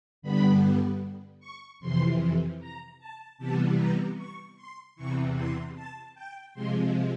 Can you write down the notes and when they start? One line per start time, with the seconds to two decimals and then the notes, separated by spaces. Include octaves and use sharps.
0.22 G2 D3 G3 B3 B5
1.40 C#6
1.80 F2 C3 E3 C6
2.60 A#5
2.99 A5
3.38 C3 E3 G3 B3 A5
3.77 A#5
4.17 C#6
4.57 C6
4.96 E2 C3 E3 C#6
5.36 C6
5.75 A5
6.15 G5
6.54 C3 F3 G#3 C6